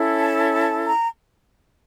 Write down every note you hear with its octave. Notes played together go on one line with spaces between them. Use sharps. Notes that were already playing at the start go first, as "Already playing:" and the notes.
Already playing: C#4 E4 A4
A5
A5
A#5